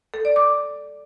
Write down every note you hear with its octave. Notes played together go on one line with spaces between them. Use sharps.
A4
D5
D6